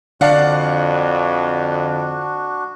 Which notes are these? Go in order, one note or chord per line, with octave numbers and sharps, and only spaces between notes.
F2 D3 D4 F#4 D5 F5 F#5